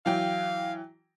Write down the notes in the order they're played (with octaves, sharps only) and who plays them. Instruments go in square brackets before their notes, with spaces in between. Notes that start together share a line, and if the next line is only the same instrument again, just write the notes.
[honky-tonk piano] E3 F#3 G5 [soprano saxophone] F5